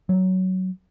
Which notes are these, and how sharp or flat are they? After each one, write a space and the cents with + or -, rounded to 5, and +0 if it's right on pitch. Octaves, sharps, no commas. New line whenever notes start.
F#3 +10